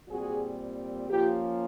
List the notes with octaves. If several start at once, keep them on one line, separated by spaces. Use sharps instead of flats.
A#2 G3 C4 F#4 G#4
F3 A#3 C#4 F4 G4